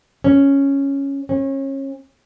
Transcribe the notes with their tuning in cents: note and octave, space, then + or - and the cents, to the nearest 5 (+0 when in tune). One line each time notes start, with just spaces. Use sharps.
C#4 +0
C#4 -30